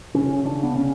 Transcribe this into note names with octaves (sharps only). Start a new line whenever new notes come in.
C#3 C#4
C#3 D4
B3
C#3 C#4